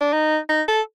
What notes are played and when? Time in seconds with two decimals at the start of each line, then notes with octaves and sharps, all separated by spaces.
0.01 D4
0.12 D#4
0.49 D#4
0.68 A4